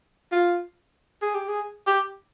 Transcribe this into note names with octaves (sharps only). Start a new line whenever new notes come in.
F4
G#4
G4
G#4
G4